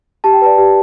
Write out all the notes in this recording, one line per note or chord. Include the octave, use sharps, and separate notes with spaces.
G4 A5
G5
B4 D5 A5
G4